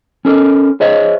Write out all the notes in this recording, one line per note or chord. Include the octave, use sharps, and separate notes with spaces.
C#4 A4 A#4
G#4 C5 C#5 D#5 E5